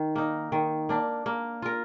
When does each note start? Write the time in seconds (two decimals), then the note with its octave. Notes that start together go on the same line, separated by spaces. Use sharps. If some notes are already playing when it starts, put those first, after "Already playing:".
Already playing: D#3
0.16 A#3 D#4
0.52 D#3
0.89 A#3 D4
1.26 A#3
1.62 F4 A#4